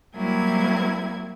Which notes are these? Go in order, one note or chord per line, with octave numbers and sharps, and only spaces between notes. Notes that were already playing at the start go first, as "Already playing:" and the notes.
F#3 G3 A#3 C4 E4 G#6